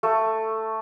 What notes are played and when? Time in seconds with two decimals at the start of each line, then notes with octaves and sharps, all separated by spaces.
0.03 A3